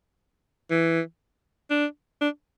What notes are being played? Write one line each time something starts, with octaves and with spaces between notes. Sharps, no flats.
E3
D4
D4